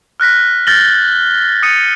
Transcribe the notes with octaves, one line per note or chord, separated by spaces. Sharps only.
F6 F#6 A#6 B6
F6 G6 A6 A#6 F#7 G7
D#6 A6 C#7 D#7